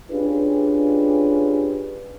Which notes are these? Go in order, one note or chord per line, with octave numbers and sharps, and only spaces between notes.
C#4 D4 F4 G4 G#4 B4